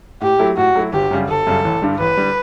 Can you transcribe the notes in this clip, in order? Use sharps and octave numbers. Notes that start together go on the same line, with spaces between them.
A2 G4
F#3 A3 E4
A2 F#4
F#3 A3 E4
G1 G4
F#2 C#3 G3
G1 A4
F#2 C#3 G3
A1
G2 D3 G3
A1 B4
D3 G3